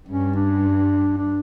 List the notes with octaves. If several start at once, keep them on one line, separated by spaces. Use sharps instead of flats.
G2 C#4
D4
D4